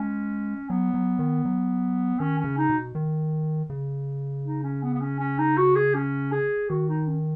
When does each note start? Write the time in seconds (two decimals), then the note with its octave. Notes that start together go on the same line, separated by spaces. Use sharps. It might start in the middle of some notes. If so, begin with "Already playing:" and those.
Already playing: G#3 C#4
0.69 F#3 B3
0.94 F#3
1.19 D#3
1.45 F#3
2.20 D#3 C#4
2.39 C#4
2.44 C#3
2.57 D#4
2.69 B2
2.95 D#3
3.70 C#3
4.45 D#4
4.63 C#4
4.83 B3
4.94 B3
5.01 C#4
5.20 C#4
5.38 D#4
5.57 F#4
5.76 G#4
5.94 C#4
6.32 G#4
6.69 D#3 F#4
6.89 D#4
7.07 C#4